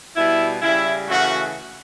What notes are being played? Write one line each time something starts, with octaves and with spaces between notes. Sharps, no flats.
B2 G3 E4
C#3 G3 E4
C#3 E3 A3 F#4